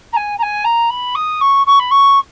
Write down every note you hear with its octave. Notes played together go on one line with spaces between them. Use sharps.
A#5
G#5
A#5
G#5
A#5
B5
D#6
C#6
C#6
B5
C#6